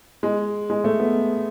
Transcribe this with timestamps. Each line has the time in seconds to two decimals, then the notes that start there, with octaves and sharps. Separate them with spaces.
0.23 G#3
0.70 G#3
0.84 A3
1.00 B3